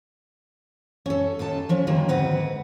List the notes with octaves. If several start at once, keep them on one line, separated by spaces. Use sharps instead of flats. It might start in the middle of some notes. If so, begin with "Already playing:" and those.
C#4 A4
D#2 F4 A4 A5
F3 C#4
D3 D#3 F#3 A#3
D2 G#2 C4 B4 F#5